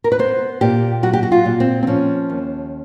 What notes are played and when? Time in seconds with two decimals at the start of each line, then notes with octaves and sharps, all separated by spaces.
0.04 A#4
0.12 B4
0.19 B3 C5
0.61 A#2 G4
1.03 F#3 F#4
1.13 G4
1.23 F#4
1.32 F4
1.46 A#2
1.60 C4
1.83 C4
1.87 F3 C#4
2.30 D#2